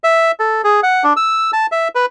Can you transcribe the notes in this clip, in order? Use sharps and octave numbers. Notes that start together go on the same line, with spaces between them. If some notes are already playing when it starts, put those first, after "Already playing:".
E5
A4
G#4
F#5
D4
E6
A5
E5
B4